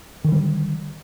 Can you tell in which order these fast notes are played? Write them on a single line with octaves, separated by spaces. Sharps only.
D#3 D3 G3